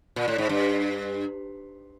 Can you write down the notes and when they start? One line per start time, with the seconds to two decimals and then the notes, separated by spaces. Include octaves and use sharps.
0.16 A#2
0.28 A2
0.38 G#2
0.49 G2